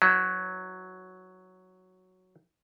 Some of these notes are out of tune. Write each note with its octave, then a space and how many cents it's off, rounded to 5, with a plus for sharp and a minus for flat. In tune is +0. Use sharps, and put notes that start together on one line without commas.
F#3 +0 E4 -30 B4 +35